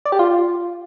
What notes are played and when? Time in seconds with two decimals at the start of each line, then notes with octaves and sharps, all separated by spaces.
0.05 D5
0.12 G4
0.19 F4